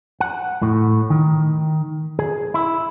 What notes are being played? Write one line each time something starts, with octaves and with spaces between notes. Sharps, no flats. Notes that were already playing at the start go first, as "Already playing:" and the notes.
F#5
A2
D#3
G#4
E4